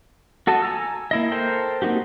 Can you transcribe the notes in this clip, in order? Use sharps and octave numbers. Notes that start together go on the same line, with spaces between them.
F#4 A4 D#5 A5
G#5 A#5 E6
A#3 E4 D#5
A4 A#4 C5 G5
A#3 C4 D#4 F#4 G4